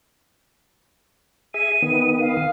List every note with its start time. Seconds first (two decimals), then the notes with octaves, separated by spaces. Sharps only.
1.54 G#4 E5 D#7
1.83 D#3 B3
2.20 F5